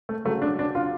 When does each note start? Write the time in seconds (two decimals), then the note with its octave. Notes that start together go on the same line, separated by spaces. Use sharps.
0.09 A3
0.25 C#3 F#3 A3
0.42 D4
0.59 D4
0.75 F4